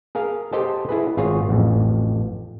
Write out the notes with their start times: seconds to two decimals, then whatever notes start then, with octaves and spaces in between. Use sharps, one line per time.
0.15 G#4 A#4 F5
0.52 G4 A4 C5 D#5 G5 A5
0.89 E4 G#4 B4
1.17 G#1 F4 G#4 C#5
1.49 A1 F2